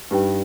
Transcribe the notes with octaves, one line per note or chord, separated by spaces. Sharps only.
G2 D#4 G4 B4 G5